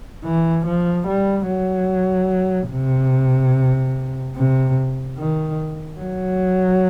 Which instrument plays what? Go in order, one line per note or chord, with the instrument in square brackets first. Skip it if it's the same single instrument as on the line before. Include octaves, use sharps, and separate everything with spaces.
[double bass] E3
F3
G3
F#3
C3
C3
D#3
F#3